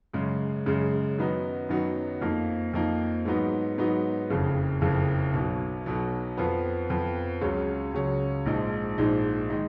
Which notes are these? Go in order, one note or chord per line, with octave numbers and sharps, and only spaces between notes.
F#2 C#3 G#3
F#2 C#3 G#3
F#2 D#3 F#3 B3 D#4
F#2 D#3 F#3 B3 D#4
F2 F3 A#3 D#4
F2 F3 A#3 D#4
G#2 F#3 B3 D#4
G#2 F#3 B3 D#4
F#1 F2 C#3
F#1 F2 C#3
B1 B2 F#3
B1 B2 F#3
F2 F3 B3
F2 F3 B3
C#2 C#3 F#3 C#4
C#2 C#3 F#3 C#4
A#1 G#2 F3 G#3 D#4
A#1 G#2 F3 G#3 D#4
D#3 G#3 D#4